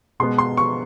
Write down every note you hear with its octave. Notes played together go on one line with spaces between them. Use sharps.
B2 G#3 B3 C6
C6
C#6